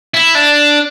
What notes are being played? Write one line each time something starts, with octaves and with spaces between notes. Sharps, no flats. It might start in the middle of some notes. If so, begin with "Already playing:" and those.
E4
D4